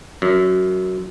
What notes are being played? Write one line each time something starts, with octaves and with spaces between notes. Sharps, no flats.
F#2